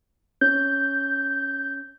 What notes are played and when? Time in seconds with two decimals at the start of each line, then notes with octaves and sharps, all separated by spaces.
0.41 C#4 G6